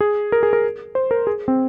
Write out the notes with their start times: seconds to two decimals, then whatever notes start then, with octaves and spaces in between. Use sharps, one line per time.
0.01 G#4
0.32 A#4
0.43 G#4
0.53 A#4
0.95 C5
1.11 A#4
1.27 G#4
1.48 C4